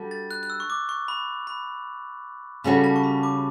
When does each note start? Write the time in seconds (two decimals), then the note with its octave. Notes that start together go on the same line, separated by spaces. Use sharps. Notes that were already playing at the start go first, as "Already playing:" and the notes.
Already playing: G3 D4 F#4 A4
0.11 A6
0.31 F#6
0.43 F#6
0.50 E6
0.60 C#6
0.70 D6
0.89 C#6
1.08 B5
1.47 B5
2.64 C#3 G3 C#4 F#4 A4 B5
2.84 A5
2.96 C#6
3.04 B5
3.23 D6